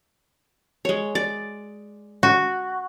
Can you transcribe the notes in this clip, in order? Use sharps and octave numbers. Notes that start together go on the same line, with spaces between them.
G#3 C#5
D5
F#4